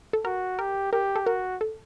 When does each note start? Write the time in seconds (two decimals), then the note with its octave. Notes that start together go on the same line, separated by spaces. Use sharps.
0.13 A4
0.25 F#4 A#4
0.59 G4 A#4
0.93 G4 A#4
1.16 A4
1.26 F#4 A#4
1.61 A4